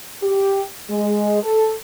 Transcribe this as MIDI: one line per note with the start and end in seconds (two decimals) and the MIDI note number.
0.23 0.63 67
0.89 1.39 56
1.42 1.73 69